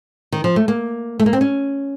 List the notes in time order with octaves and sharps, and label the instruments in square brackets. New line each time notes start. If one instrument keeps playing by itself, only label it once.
[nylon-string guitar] D#3
F3
A3
A#3
A3
A#3
C4
C#4